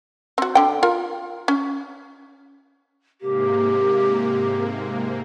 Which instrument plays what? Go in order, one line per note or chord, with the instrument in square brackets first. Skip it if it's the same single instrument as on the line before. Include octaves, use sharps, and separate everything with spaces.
[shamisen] C4 F#4
D3 G5
F4 A#4
C#4
[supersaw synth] G#2 C3 A#3 [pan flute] G4